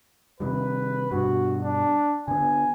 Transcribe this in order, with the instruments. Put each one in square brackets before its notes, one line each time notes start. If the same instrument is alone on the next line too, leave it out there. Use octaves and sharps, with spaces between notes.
[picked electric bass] C3 D#3 G3 [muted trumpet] B4
[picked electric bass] G2 B2 [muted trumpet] F#4
[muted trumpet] D4
[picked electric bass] D3 B3 [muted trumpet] G#5